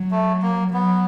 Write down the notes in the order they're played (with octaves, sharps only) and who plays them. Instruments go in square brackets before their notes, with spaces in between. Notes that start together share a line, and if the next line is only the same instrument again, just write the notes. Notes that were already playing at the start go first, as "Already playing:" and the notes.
Already playing: [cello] F#3
[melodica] A3
A#3
[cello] F#3 [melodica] B3